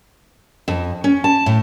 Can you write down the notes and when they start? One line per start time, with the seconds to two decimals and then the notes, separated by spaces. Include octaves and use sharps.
0.68 F2
1.04 C#4
1.24 A5
1.46 A2